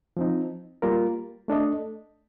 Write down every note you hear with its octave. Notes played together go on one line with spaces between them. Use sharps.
F3 C4 D#4
G3 A#3 F4 A#4
A3 D4 A4 D#5